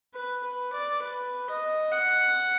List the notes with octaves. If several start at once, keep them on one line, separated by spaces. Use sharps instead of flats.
B4
B4
D5
B4
D#5
F#5